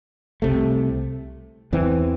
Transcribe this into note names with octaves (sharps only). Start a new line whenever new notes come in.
C2 C3 A3
E2 E3 C4